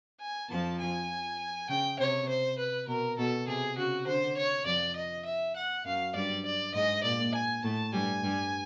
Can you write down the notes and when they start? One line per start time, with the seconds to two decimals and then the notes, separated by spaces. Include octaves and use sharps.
0.21 G#5
0.49 F2 F3 A5
0.79 G#5
1.69 C#3 G5
1.99 C3 C#5
2.28 C5
2.58 B4
2.87 B2 A#4
3.18 B2 A4
3.47 C3 G#4
3.78 C#3 F#4
4.06 D3 C5
4.37 C#5
4.66 F2 F3 D5
4.96 D#5
5.25 E5
5.56 F#5
5.85 F#2 F#3 F5
6.14 G2 G3 D5
6.45 D5
6.74 G#2 G#3 D#5
7.04 A#2 A#3 D5
7.34 G#5
7.64 A2 A3 A5
7.93 G2 G3 G#5
8.23 G2 G3